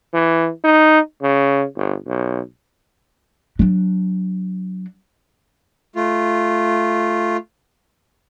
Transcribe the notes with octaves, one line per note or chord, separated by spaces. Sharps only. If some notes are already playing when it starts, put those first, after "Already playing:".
E3
D#4
C#3
G1
B1
F#3 D4
A3 F4